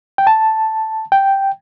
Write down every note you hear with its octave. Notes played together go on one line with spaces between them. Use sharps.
G5
A5
G5